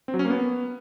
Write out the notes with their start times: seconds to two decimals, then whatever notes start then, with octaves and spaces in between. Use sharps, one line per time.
0.08 C4
0.14 F#3
0.19 C#4
0.25 A#3
0.30 B3